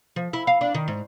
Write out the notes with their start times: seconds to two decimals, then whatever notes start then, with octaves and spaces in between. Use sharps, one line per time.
0.16 F3
0.33 E4
0.47 F5
0.61 D4
0.75 D#3
0.88 G#2